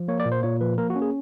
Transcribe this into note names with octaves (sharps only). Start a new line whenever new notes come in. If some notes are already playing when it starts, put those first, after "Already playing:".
Already playing: F3
A#3 C#5
D5
A#2
C5
A#2 C#5
F3 B4
A#3 A#4
F#4
C#4
G#4